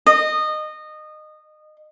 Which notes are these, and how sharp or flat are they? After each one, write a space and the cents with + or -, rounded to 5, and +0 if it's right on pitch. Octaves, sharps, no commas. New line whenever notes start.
D#5 -20